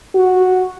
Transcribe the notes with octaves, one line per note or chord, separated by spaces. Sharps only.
F#4